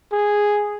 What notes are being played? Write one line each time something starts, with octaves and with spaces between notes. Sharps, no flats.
G#4